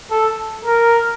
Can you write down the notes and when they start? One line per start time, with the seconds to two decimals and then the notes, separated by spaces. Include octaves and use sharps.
0.11 A4
0.65 A#4